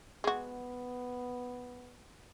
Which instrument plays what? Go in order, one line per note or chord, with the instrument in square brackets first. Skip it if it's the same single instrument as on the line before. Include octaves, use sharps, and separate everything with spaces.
[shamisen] G#3 F#4 [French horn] B3